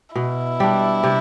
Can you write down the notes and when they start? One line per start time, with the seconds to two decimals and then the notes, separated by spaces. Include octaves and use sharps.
0.16 B2 E4
0.60 G3 D4
1.04 C3